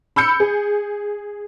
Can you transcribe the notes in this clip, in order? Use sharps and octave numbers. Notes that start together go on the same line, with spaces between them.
B5 E6 G6 C#7
G#4